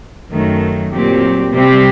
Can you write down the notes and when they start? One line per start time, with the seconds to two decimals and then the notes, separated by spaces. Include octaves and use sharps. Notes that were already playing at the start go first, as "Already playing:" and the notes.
0.30 F#2 D#3 F#3 A3
0.92 A#2 F#3 C4 G4
1.54 C3 G3 C4 G4